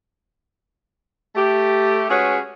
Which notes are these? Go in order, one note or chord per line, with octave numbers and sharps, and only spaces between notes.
A3 G4
G#3 C#4 F#4 G#4 B4 C#5